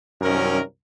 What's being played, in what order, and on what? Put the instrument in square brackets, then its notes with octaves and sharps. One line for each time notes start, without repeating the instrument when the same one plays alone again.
[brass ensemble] C2 F#2 C3 D#3 C#4 A#4